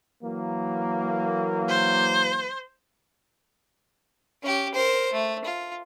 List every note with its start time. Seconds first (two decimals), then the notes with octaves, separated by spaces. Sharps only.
0.23 E3 F#3 A#3
1.69 C5
4.42 C#4 G4
4.74 A#4 C5
5.12 A3
5.44 F4